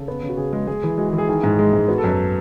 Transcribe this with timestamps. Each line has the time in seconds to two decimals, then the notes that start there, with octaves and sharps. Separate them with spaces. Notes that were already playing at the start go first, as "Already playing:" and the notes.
Already playing: C#3 A4
0.08 B3
0.23 C#3
0.29 F#4
0.37 C#3 G#4
0.53 G#3
0.67 G#3 G#4
0.84 E3
0.98 G#3 F#4
1.08 G#4
1.13 E3
1.18 G#4
1.29 D#3 G#4
1.44 G#2
1.59 G#3
1.73 G#2
1.88 B3 F#4
1.98 A4
2.04 F#2 B4